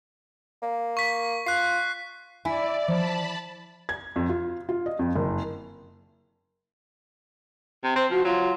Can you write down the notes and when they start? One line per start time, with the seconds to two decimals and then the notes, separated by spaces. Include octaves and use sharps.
0.63 A#3
0.97 C#6 B6
1.46 F4 F#6 C7
2.45 E4 D5 G#5
2.88 F3 A5 B5
3.89 G#6
4.16 F2
4.29 F4
4.69 F4
4.86 D#5
4.99 F2
5.16 F#1
7.84 C3
7.96 C4 C5
8.11 F3 F#4
8.25 F#3 F4